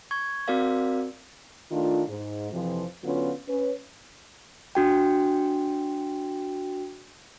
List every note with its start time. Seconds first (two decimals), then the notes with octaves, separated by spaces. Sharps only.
0.11 C#6 G#6
0.48 C4 F#4 A#4 D5 F5
1.70 D#3 A3 D4 F4
2.08 G#2
2.51 F2 C3 E3 F3
3.03 D3 F#3 B3 C#4 F4
3.47 C#4 B4
4.75 D4 F#4 G5